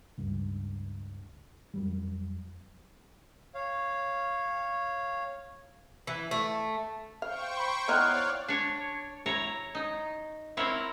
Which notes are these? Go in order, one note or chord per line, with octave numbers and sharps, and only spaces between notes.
C#2 G2
F2 F#3 G3
C#5 F5
E3
A3
C5 F5 G5 C#6
B5 C6
B3 D#4 E4 C#5 D5 F5 F6 F#6
D4 C#5
E4 C#5 A#5
D#4
C4 E4 A#4 C#5